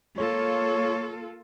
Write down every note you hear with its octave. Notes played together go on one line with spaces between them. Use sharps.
A#3 F4 A4 C#5